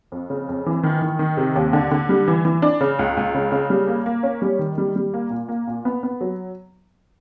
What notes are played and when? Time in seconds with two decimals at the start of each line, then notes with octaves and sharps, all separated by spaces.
0.12 F2
0.30 C#3
0.49 F2
0.66 E3
0.83 D#3
1.02 D#3
1.19 D#3
1.37 C3
1.56 D#2
1.73 D3
1.91 D3
2.09 G3
2.28 E3
2.45 E3
2.62 D4
2.81 C#3
2.99 C#2
3.17 C#2
3.34 C#3
3.52 C#3
3.70 G3
3.87 A#3
4.06 A#3
4.23 C#4
4.42 G3
4.59 D#3
4.78 G3
4.96 G3
5.14 A#3
5.30 A#2
5.48 A#3
5.67 A#2
5.85 B3
6.03 B3
6.21 F#3